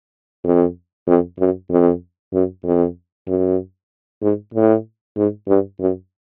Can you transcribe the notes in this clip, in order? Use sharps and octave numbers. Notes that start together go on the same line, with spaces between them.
F2
F2
F#2
F2
F#2
F2
F#2
G#2
A2
G#2
G2
F#2